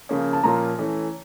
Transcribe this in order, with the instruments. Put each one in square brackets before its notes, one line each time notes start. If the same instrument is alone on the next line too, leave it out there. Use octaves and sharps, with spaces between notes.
[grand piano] C#3 F3 A#3 C#4
[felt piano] A5
[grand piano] A#2 F3 A#3 C#4 F4 [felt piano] A#5
[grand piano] E3 A3 C#4